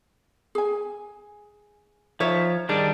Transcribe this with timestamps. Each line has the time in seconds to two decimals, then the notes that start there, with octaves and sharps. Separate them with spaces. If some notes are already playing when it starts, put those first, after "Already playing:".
0.55 G#4 G#5
2.20 F3 D#4 C#5 E5
2.69 D#3 G3 D4 G#4